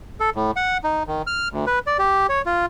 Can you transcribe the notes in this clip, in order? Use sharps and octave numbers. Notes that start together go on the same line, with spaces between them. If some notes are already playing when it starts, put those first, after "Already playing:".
A4
A2
F#5
D#4
D#3
F6
D2
B4
D5
G4
C#5
F4